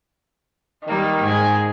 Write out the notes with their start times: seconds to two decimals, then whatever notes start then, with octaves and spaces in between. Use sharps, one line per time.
0.87 D#3 G3 A#3
1.23 G#2 G#4 G#5